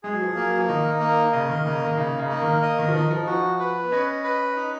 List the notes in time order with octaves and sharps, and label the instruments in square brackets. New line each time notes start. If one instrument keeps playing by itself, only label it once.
[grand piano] G#3 [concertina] G#4
[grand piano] F#3
F3
F#3
[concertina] A#3
[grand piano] F#3
F3
[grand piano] D#3 [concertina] D#4
[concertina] A#3
[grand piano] C#3 [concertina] D#5
[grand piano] D#3
[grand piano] C#3 [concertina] A#3
[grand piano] D#3
[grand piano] C#3 [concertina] D#4
[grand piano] C#3
[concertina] A#3
[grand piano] D#3
[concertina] D#5
[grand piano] D#3
F3
[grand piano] D#3 [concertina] D#4
[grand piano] F3
[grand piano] F3 [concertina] F#4
[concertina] B4
[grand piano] B3
[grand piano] C#4 [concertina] D#5
[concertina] B4
D#4